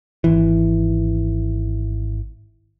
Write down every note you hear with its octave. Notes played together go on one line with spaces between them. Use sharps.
G#1 E3